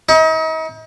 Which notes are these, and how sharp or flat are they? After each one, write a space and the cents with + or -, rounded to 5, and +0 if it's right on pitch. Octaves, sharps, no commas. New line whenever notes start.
D#4 +40